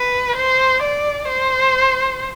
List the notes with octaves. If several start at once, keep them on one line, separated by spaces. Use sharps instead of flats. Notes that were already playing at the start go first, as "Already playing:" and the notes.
Already playing: B4
C5
D5
C5